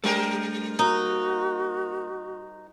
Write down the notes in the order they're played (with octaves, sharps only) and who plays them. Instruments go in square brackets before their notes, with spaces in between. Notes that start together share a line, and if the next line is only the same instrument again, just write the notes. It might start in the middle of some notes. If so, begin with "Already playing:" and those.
[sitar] G3 A#4 C5 [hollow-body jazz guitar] A3 D4 G4
[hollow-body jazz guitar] A#3 [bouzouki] D#4 [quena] F#4